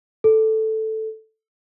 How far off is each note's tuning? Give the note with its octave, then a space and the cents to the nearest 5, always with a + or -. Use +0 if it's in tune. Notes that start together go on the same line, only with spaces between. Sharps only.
A4 +0